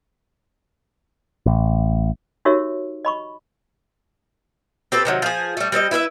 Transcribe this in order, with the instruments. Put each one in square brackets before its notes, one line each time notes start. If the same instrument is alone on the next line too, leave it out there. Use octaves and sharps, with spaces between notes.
[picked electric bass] A1
[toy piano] D#4 F#4 G4 A#4 C#5 E5
D#5 B5 C#6
[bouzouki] C4 G4 A4 B4
C3 D#3 F#3
F3 G#4
G3 A3
G3 C4 D5 D#5
E4 B4 C5 E5